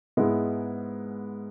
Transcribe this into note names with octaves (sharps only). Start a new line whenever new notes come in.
G#2 G#3 B3 E4